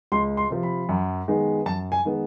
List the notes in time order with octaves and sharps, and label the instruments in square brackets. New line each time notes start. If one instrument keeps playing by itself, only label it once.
[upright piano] C#2 C6
C6
C3 F3
B5
F#2
D#3 G#3 B3
F#2 A5
G#5
D#3 G#3 B3